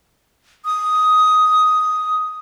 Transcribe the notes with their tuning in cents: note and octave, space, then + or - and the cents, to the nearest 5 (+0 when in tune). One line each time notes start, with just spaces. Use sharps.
D#6 +10